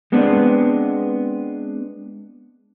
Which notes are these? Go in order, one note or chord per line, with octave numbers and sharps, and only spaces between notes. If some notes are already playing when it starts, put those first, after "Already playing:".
G#3 B3 C4 D4